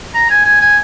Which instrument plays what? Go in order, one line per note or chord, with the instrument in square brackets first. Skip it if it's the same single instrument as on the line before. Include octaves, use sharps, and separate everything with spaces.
[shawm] A#5
G#5
G#5
G#5